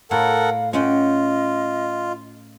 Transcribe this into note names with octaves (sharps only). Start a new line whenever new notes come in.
A2 A4 A#4 F5 F#5
C#4 F4 D#5 F#5 G5